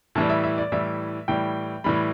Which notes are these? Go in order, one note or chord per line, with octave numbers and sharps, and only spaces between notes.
A2 E3 G3 A5
E5
E5
D5
A2 E3 G3 E5
A2 E3 G3 G5
A2 E3 G3 B5